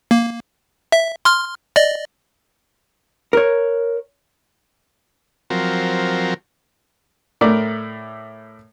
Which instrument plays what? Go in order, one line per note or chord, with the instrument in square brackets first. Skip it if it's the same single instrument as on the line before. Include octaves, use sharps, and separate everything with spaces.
[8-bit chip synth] A#3
E5
C6 F6
D5 D#5
[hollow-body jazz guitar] A#4 C#5
[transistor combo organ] F3 F#3 C4 A#4
[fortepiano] A2 A3 A#4 D5